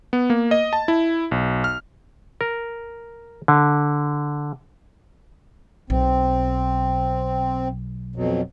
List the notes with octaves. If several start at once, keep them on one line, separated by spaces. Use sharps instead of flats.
B3
A#3
D#5
A5
E4
B1
F6
A#4
D3
B1 C4
F2 B2 F#3